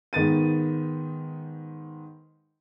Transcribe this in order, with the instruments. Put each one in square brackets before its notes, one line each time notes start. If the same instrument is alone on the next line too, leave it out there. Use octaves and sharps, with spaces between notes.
[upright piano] G#2 D#3 B3 A6 D#7